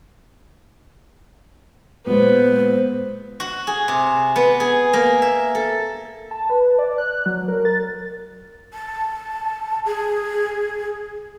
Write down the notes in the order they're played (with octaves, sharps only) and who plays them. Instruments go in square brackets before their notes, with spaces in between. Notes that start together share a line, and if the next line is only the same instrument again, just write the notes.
[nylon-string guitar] A#2 G#3 [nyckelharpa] B3 [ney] C5
[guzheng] F#4
G#4
C3
B3
G#4
A#3
E5
A4
[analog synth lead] A5
B4
D5
F#6
F#3
A#4
A6
[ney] A5
G#4